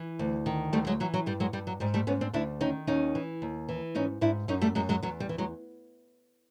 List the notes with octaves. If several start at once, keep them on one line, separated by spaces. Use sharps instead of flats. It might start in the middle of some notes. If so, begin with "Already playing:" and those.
Already playing: E3
D2
D#3
D2 G3 A3
F#3 G#3
E3 F#3
F#3
G2 G3
F#3 G#3
G2 G3
F#3
G#2 G3
G3 A3
G#2 B3 C#4
C4 D4
D2 D4 E4
D#3 C#4 D#4
D#2 C#4 D#4
E3
D#2
E3
G#2 C#4 D#4
G#2 D4 E4
F#2 C#4 D#4
G3 A3
F#2 F#3 G#3
F#3 G#3
E2 F#3
G3
E3
F#3 G#3